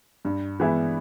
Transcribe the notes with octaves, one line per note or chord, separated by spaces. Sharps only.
G2
E3 G#3 B3 E4